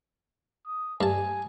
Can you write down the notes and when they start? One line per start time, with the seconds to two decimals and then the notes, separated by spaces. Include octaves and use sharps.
0.66 D#6
1.01 G2 G#5 A5